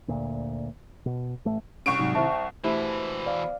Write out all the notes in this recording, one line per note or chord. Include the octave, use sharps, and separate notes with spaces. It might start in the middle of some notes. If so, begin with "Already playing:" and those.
D2 A#2
B2
A1 A3
C2 C#4 C#6 D7
G#2 C3 F#3 D#4
C3 D#3 E4 C5 E5 A5
G5
B2 E3 A3 E4 G4 C5
D5 F5